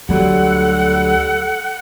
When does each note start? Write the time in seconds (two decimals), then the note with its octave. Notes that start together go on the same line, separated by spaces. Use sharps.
0.09 D2 F#3 G3 A4 F#5